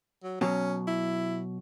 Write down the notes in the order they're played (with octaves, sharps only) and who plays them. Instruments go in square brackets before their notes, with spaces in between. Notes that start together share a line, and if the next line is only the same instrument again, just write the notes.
[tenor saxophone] F#3
[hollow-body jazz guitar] B2 F#3 [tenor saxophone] C#4
[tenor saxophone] E4